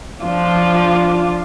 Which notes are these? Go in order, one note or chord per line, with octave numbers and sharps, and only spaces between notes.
F3 D4 F4